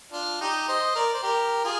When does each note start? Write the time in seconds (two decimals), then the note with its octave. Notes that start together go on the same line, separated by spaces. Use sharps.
0.13 D4 F4
0.41 D#4 G4
0.68 C5 D#5
0.95 A#4 D5
1.14 C5
1.23 G4 A#4
1.64 F4 G#4